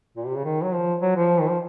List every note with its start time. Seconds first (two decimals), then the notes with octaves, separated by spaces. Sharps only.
0.17 A#2
0.27 C3
0.36 C#3
0.45 D#3
0.63 F#3
0.74 F3
1.02 F#3
1.16 F3
1.40 D#3
1.49 F3